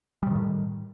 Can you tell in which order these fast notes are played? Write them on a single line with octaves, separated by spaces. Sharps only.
G3 C3 D#3 A2